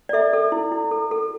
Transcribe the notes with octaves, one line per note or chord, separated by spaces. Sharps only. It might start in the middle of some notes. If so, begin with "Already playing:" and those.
D5
A4 E5
A4
E4
E4
A4
A4